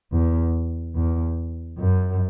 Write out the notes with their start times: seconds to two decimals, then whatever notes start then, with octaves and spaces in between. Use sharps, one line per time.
0.12 E2
0.95 E2
1.78 F#2